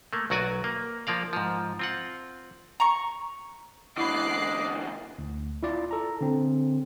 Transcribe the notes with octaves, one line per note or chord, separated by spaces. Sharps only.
A3 A#3
B1 F#3 F#4 D5 G#5
A#3
F3 A#3 D5 F5
G#2 F3
C4 F4 F#5
A#5 C#6
E2 D3 E4 D#5 B5 D6 F#6 C7
D2
E4 F4 D5
A4 A#5
D3 C4